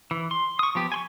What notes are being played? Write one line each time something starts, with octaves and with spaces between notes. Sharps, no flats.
E3
C6
C#6 D#6
F3 B3 G4
G#5 C6 C#6